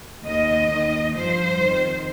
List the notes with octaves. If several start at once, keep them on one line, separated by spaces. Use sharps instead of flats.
D#2 D#3 D#5
D#2 D#3
G2 F3 C5
F2 D#3